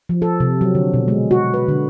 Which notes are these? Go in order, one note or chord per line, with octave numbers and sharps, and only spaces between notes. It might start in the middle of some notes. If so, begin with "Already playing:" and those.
F3
A4
C3
F#3
D3
B2
G#3
F#4
B4
D3